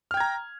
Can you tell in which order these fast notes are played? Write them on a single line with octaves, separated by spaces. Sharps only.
F6 G5 G#6 A#5